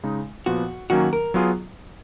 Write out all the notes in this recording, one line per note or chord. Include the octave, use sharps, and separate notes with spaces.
C#3 G#3 D#4
A#2 F3 B3 F#4
D#3 F#3 A#3 C#4 F#4
A#4
F#3 B3 F4 G#4